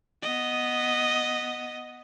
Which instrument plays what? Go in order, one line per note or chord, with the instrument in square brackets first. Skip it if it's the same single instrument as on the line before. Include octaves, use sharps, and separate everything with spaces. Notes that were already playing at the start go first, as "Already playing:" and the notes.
[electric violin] B3 D#5